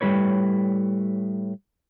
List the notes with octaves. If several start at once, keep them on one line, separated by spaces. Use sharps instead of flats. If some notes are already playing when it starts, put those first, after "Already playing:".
A2 G3 D#4 B4 C#5